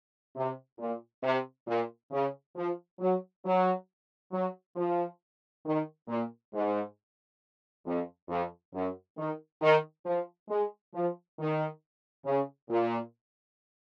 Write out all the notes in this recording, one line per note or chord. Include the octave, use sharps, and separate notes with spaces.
C3
A#2
C3
A#2
C#3
F3
F#3
F#3
F#3
F3
D#3
A#2
G#2
F2
F2
F#2
D#3
D#3
F3
G#3
F3
D#3
C#3
A#2